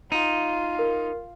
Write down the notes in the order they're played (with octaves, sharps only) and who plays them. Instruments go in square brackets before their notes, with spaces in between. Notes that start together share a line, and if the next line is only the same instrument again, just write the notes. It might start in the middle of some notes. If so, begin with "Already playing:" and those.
[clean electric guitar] D#4 [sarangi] F4
[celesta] A#4